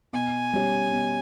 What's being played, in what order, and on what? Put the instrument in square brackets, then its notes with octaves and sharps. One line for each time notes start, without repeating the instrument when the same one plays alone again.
[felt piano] B2 [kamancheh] G#5
[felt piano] G3 C#4 G4 C#5
B2